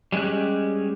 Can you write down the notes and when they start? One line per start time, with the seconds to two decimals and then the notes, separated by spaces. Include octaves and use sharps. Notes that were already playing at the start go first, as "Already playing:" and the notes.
0.12 G3 G#3 C#4 G4 F#6